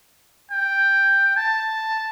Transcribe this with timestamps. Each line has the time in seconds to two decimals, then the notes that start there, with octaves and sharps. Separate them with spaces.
0.51 G5
1.36 A5